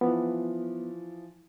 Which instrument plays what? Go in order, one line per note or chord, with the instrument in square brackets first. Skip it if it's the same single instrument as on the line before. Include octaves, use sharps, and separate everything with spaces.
[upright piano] E3 F3 [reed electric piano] B3